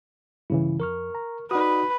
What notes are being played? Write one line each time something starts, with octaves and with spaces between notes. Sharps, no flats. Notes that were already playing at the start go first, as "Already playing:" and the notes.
G2 C#3 E3 E4
F2 A#4 C#6 F6
A#5
D#4 F#4 B4 D5 F#5 D#6